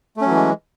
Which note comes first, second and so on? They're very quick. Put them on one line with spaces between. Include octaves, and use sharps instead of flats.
A3 C#4 F#3 E3 G#3